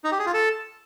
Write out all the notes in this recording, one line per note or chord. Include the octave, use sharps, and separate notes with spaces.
D#4
G4
G#4
F4
A4